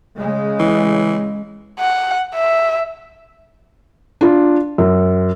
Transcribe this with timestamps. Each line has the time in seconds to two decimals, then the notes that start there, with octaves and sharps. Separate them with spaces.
0.16 C#3 G#3
0.59 E3
1.79 F#5
2.35 E5
4.21 D4 F4
4.78 F#2